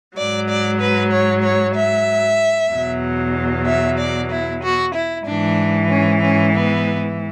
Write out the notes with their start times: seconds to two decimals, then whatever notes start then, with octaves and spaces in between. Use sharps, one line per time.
0.16 G#2 F#3 D5
0.48 D5
0.80 B4
1.11 C#5
1.43 C#5
1.75 E5
2.70 E2 B2 F#3
3.66 E5
3.98 D5
4.30 E4
4.62 F#4
4.94 E4
5.26 G#2 E3 D4
5.89 C#4
6.22 C#4
6.54 B3